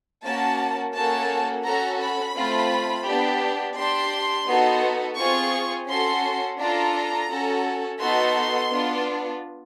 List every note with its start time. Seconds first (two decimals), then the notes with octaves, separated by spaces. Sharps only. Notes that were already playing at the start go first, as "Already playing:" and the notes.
0.24 A#3 C#4 F#4 A5
0.94 A#3 C#4 F#4 A4 A5
1.65 C#4 F#4 A4 A#5
2.00 B5
2.35 A3 C4 F4
3.06 B3 D4 G4
3.77 D4 G4 C6
4.48 B3 D#4 F#4 A4
5.17 C4 F4 G#4 C#6
5.88 C#4 F#4 A4 C6
6.59 D4 F4 A4 A#5
7.29 C#4 F#4 A4
8.00 B3 D#4 F#4 A4 C6
8.71 B3 D4 F4